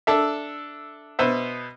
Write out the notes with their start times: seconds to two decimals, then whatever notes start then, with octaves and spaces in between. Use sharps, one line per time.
0.07 D4 A4 E5
1.19 B2 B3 C5 E5